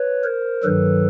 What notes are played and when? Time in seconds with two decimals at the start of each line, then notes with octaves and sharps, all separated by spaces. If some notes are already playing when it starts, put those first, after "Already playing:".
Already playing: B4 C#5
0.24 A#4 C5
0.63 G2 D#3 F#3 A4 B4